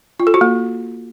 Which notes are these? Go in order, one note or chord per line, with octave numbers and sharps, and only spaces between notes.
F4
A4
F#4
A#3